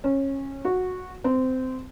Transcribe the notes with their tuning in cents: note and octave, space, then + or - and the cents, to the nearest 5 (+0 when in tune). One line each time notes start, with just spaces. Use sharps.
C#4 -20
F#4 -10
C4 -20